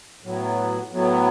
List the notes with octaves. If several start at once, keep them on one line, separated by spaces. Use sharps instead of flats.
A2 F#3 B3
A2 F#3 B3